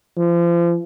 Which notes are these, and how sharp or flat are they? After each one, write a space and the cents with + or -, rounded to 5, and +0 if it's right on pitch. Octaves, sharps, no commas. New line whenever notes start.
F3 -35